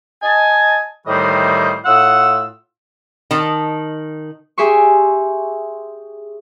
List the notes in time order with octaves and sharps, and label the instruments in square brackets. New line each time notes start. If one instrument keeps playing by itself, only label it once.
[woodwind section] D#5 G#5 A5
A2 D#3 E3 G3 C5 D#5
A2 F4 F#5 D#6 E6
[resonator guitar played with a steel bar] D#3 A5
[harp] G4 G#4 E5 C6 C#6